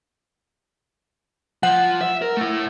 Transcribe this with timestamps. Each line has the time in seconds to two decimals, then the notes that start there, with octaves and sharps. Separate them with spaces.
1.63 F3 F#5
2.01 E5
2.22 A#4
2.37 A3 E4